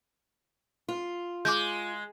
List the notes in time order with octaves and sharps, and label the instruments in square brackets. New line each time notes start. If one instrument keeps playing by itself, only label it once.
[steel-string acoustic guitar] F4
[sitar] G#3 [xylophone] D6 G6